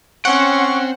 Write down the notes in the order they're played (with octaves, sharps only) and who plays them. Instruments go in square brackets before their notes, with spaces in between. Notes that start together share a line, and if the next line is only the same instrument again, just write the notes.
[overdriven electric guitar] C4 G5 [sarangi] C#4 [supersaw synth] F#5 [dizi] C#6